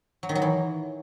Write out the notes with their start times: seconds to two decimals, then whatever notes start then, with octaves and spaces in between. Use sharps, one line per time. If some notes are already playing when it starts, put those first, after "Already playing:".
0.23 F#3
0.29 D#3
0.35 F#3
0.42 E3